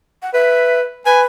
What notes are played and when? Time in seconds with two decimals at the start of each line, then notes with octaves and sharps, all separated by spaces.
0.22 F#5
0.34 B4 E5
1.06 B4 G#5